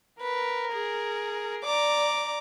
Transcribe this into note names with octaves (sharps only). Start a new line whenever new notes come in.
A#4 B4
G#4
D5 A#5 D6